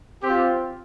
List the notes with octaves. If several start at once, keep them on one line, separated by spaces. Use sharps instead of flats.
C4 F4 G4